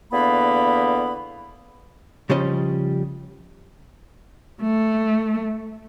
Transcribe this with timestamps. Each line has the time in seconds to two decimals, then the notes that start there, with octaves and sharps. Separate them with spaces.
0.12 E2 D3 A#3 B3 B5
2.29 C#3 F3 G3 C#4 D#5
4.61 A3